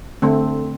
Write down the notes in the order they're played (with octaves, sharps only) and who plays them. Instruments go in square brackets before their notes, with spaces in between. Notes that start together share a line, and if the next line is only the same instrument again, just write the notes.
[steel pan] D3 A3 C4